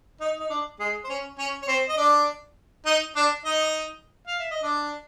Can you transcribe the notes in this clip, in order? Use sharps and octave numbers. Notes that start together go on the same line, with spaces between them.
D#4
D#4
D4
G#3 G#4
C5
C#4 C#5
C#4 C#5
C#5
C4 C5
D#5
D4 D5
D#4 D#5
D4 D5
D#4 D#5
F5
E5
D#5
D4 D5